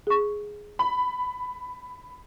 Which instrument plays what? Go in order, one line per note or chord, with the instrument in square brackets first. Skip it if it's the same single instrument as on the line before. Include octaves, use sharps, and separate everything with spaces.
[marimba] G#4 C#6
[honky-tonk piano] B5